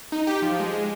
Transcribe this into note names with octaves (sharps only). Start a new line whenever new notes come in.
D#4
G4
F3
G#3